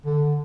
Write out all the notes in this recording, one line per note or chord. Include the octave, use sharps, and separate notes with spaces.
D3